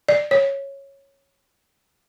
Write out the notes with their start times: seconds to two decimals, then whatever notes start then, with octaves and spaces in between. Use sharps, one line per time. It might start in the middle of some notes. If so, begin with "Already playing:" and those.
0.09 D5
0.31 C#5